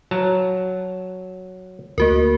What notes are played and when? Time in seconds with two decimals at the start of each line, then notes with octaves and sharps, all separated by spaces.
0.11 F#3 A5 A#5
1.98 D2 A#3 F#4 A#4